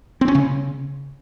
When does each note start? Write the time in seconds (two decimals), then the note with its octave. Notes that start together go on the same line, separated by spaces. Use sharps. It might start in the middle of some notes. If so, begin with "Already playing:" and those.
0.21 C4
0.28 C#4
0.35 C#3